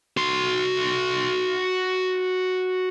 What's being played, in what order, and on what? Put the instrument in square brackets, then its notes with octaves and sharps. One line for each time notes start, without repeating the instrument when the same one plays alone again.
[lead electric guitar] F#4 C6